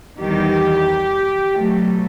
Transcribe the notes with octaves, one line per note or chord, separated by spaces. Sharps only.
E2 D#3 G3 G4
B2 F#3 A3